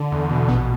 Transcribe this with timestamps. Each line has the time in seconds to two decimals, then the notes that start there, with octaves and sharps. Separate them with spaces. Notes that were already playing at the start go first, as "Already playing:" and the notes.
Already playing: D3
0.12 E2
0.30 B2
0.48 A#1 B3